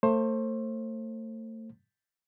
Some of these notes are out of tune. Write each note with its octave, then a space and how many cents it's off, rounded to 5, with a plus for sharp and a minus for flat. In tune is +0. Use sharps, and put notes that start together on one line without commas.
A3 +35 C5 +25